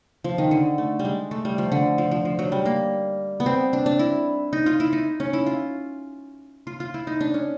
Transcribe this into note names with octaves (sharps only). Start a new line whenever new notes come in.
F3
D#3
D3
A3
G3
G#3
A3
G3
F3
D3
F3
F3
F3
F#3
G3
A#3
B3
C4
D4
D4
E4
D#4
F4
E4
D#4
C#4
E4
F4
F4
F4
E4
D#4
D4
C#4